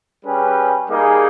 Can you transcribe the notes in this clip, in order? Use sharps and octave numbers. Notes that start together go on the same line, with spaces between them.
G3 C#4 G#4 B4 G5
G3 A#3 D#4 G#4